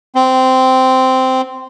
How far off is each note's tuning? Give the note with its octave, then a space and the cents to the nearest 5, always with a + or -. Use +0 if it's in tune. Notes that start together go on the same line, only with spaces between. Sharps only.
C4 -10